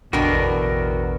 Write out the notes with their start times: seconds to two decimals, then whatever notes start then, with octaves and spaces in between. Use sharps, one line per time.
0.13 A1 E2 B2 D3 F#4 A#4 G5